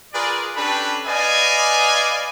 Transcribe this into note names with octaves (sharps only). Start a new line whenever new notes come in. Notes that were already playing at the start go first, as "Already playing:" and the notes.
F4 G#4 A#4 B4 D5
C#4 D4 G4 A4 B4 B5
B4 D5 D#5 F5 G#5